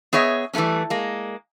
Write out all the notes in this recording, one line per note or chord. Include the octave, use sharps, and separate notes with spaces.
B3 G#4 C#5 D#5 E5
E3 G3 A3 B3 C#4
G#3 A#3